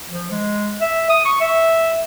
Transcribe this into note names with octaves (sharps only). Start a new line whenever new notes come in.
F3
G#3
E5
D#6
C#6
E5